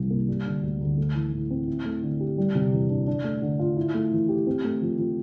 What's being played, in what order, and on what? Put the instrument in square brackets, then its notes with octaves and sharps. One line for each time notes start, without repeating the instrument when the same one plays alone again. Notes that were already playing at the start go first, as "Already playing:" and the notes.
Already playing: [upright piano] C2 C3 E3
A#3
G3
D3
D2
D2
A3
E3
A2
C4
E4
A3
D3
G4
G3
C3
E2
D4
D4
A3
D3
F4
E4
A3
E3
G4
C4
A3
F3
F3